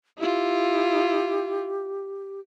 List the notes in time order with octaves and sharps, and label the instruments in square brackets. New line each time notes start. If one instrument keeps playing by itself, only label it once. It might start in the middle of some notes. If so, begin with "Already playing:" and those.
[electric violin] E4 F4 [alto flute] G4